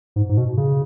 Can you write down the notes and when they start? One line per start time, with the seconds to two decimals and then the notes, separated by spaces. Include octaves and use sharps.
0.16 G#2
0.29 G#2
0.37 B2
0.57 C#3